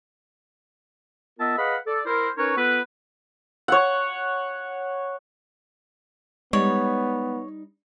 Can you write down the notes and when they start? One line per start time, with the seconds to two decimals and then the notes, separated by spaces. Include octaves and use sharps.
1.39 B3 F4 A#4 D#5 E5 A5
1.57 G#4 B4 D#5 F5 F#5 B5
1.87 A4 D5
2.06 E4 A#4 C5
2.37 C#4 D#4 A#4 B4 C#5
2.57 B3 F4 A4 B4
3.68 C#5 F#5
6.53 G3 G#3 B3 D#4 C#5 D5